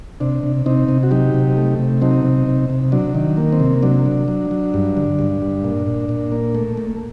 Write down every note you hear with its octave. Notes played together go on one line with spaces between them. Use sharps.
C3 D4
C3
C3 C4 D#4
C3
F#4
F#3 D#4 G4
C3
A3
C3
F#3 C4 D#4
C3
C3
C3
F#3 D4
D#3
A#3
C4
C3
F#3 D4
F#3
F#3
F#3
G2
D3
G2
G2
A#2
A#2
A#2
A#3
A3
A3